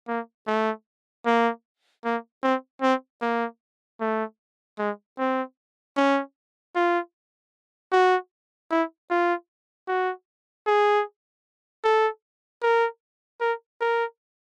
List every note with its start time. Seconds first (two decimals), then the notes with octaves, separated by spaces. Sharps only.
0.08 A#3
0.47 A3
1.26 A#3
2.04 A#3
2.43 C4
2.82 C4
3.22 A#3
4.00 A3
4.79 G#3
5.18 C4
5.97 C#4
6.75 F4
7.93 F#4
8.71 E4
9.10 F4
9.88 F#4
10.67 G#4
11.84 A4
12.63 A#4
13.41 A#4
13.81 A#4